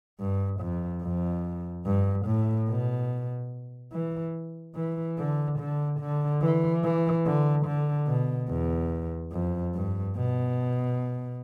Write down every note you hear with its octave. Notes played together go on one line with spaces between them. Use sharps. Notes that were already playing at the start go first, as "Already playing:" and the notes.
G2
F2
F2
G2
A2
B2
E3
E3
D3
D3
D3
E3
E3
D3
D3
B2
E2
F2
G2
B2